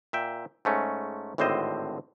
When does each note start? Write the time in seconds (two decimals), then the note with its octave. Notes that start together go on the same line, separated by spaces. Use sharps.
0.13 A#2 E5 G5
0.65 G#2 A3 C#4
1.38 G#1 A2 D3 C4 C5 D#5